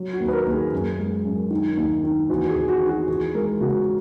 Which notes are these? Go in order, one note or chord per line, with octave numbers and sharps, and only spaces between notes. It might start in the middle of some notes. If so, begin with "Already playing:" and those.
Already playing: F#3
F#4
D#2
B4
A#4
D#2
G#4
F#2
G#3
F#2
D#3
D#2
D#3
E2 F#4
G#4
E2
F#4
D#3
F#4
E2 G#4
G#3 A#4
C#3 F#4